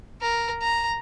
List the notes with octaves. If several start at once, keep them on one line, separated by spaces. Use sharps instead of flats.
A#4
A#5